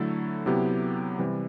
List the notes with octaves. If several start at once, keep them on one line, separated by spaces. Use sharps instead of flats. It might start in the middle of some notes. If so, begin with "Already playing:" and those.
Already playing: D3 F#3 A3 E4 A4
C3 F#3 B3 E4 G4
C3 E3 G3